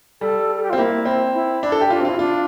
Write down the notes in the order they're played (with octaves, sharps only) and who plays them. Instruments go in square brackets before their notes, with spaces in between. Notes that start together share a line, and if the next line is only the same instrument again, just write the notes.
[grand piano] G3 [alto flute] A4
[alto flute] A4
G4
F4
[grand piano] C4
[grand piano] A#3 [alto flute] E4
[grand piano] C4
[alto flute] E4
[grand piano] D4
A4
G4
[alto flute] D4 [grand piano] F4
[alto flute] C4
[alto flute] E4 [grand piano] F4
[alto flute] D4 [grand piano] F4